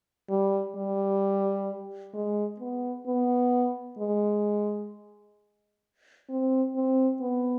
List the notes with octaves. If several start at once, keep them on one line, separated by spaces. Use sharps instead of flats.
G3
G3
G#3
B3
B3
G#3
C4
C4
B3